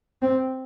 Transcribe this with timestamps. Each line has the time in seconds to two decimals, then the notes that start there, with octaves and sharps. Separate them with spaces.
0.22 C4